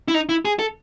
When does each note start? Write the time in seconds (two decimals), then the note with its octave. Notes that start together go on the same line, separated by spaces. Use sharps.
0.08 E4
0.14 D#4
0.29 E4
0.45 G#4
0.59 A4